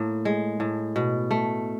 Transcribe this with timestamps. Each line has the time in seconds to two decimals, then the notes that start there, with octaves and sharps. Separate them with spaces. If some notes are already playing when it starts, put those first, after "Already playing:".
Already playing: A2 A#3
0.25 G#3
0.60 A2
0.96 B2
1.31 A3